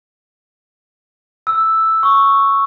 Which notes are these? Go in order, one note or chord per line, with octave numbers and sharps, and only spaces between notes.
E6
C#6